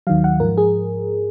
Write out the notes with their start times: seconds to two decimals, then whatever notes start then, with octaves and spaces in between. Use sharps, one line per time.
0.07 D#2 D#3 F#3 F5
0.24 F#5
0.40 G#2 F3 A#4
0.57 G#4